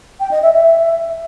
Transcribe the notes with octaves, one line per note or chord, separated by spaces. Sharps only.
G5
D#5
E5
E5